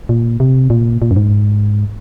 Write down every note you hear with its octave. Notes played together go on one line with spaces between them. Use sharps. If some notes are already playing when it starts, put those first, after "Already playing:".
A#2
C3
A#2
A#2
F#2
G#2